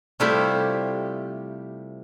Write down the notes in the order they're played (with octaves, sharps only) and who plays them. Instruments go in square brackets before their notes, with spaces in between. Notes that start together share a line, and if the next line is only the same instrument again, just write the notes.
[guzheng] C3 G3 A3 E4 F4 G4